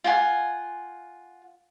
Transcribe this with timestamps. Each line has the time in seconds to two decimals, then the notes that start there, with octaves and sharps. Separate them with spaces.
0.04 F4 F#5 G#5